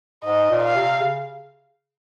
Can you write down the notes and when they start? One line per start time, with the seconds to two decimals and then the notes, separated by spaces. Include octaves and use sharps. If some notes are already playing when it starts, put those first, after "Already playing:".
0.25 G#2 D#5
0.51 A#2
0.63 F5
0.75 C3
1.01 C#3